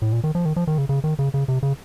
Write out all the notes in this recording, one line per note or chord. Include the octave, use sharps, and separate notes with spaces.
A2
A#2
D#3
F3
D#3
F3
D#3
C#3
C#3
D#3
C#3
C#3
C3
C#3